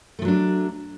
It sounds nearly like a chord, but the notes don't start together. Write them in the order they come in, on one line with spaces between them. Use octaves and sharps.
A3 F3 F#3 D4